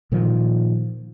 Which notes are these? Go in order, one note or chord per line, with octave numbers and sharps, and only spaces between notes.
A#2 D#3 F3